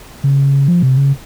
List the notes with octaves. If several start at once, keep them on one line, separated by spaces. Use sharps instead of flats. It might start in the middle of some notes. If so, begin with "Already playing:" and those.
C#3
F3
C3
C#3